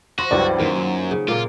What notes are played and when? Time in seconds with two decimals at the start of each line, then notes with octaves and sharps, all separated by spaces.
0.19 F3 F#4 C6 A#6
0.31 C#2 G2 E3 F#3 D5
0.60 F#2 D#3 A#3 F4
0.76 F#3
1.11 C#3
1.28 A#2 A#3 F4